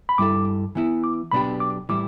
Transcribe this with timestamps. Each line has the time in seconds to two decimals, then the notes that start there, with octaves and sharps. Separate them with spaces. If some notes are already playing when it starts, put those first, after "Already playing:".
0.09 B5
0.18 G2 G3 E4 A4 D6
0.75 E3 B3 E4
1.04 D6
1.32 B1 B2 B3 D4 G4 B5
1.60 D6
1.89 A2 E3 G3 E4 D6